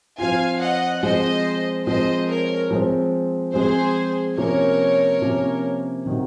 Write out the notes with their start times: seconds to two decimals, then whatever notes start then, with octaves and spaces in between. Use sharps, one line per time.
0.18 F3 C4 F4 F5 G#5
0.60 D#5 F#5
1.02 F3 G#3 C4 C5 D#5
1.86 F3 G#3 C4 C5 D#5
2.29 A#4 C#5
2.71 F3 G#3 C4
3.53 F3 G#3 C4 G#4 C5
4.37 C3 F3 A#3 C#4 A#4 C#5
5.21 C3 F3 A#3 C#4
6.06 C3 D#3 F#3